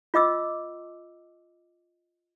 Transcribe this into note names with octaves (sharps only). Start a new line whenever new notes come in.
F4 D#5 D6 E6